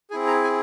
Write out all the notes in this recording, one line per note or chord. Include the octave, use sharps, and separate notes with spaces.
C4 E4 G#4 G#5
A#5
G#5